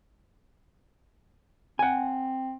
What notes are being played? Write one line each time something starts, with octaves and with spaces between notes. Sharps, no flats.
C4 F#5 G#5